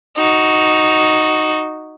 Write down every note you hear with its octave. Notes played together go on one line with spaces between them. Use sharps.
D#4 F#4